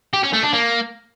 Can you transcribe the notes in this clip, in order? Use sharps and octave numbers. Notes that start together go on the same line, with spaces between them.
G4
C#4
A3
D4
A#3